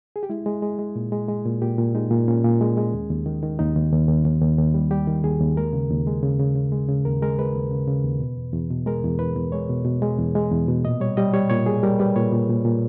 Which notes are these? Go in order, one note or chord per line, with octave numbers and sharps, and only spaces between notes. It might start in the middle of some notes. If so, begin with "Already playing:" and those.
G#4
G4
G#3 E4
G#3
G#3
G#3
A#2
G#3
G#3
A#2
A#2 G4
A#2
G#3 D#4
A#2
A#2 C#4
A#2
G#3
G#3
D#2
D#2
D#3
D#3
D#2 D#4
D#2
D#2
D#2
D#2
D#2
D#2
G3
G3 G4
D#3
D#2 G#4
D#2
G#3 A#4
C#3
D#2
G#3
C#3
C#3
C#3
G#3
C#3
D#2 A#4
G#3 A#4
G#3 B4
D#2
C#3
C#3
D#2
B2
E2
E2
B2
G#3 A#4
E2
E2 B4
E2
G#3 C#5
B2
B2
G#3
E2
G#3
E2
B2
A#2 D#5
G3 C#5
G3 D#5
G3 C#5
A#2 C#5
G3 G#4
G3 A#4
G3 B4
A#2 C#5
A#2
A#2
A#2